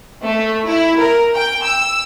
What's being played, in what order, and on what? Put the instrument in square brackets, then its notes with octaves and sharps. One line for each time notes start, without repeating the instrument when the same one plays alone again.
[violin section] A3
E4
A#4
G5
E6